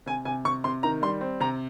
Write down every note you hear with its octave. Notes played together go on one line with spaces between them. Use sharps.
C3 G#5
C3 G#5
C3 C#6
C3 C6
D#3 A#5
G3 C6
C4
C3 A#5